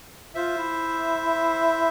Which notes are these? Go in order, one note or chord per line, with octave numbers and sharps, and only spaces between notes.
F4 C5 E5
E4